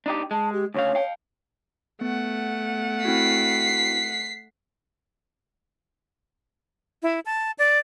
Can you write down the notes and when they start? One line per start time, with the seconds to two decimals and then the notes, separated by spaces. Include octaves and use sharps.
0.06 D4 D#4 G4
0.31 G#3 A5
0.52 G4
0.74 D2 C#3 C#5 F5
0.95 F5 G5
2.01 A3 B3 F#5
3.05 C4 E4 F#4 B6 C7
7.03 E4
7.26 A5
7.59 D5